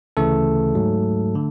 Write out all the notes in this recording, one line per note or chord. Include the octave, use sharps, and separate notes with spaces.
D2 C#3 E3 A3 A4
G#2 F#3
D3